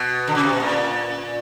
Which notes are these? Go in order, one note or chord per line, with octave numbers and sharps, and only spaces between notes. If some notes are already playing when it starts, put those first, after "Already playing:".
Already playing: B2
D3
C#3
C3
B2
A#2